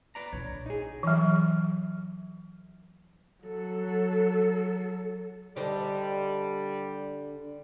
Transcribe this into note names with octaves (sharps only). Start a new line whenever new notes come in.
B4 D5 A#5
A#1 D3 C#5
D#4 G#4
E3 F#3
F#3 A4
D3 G3 D#4 C5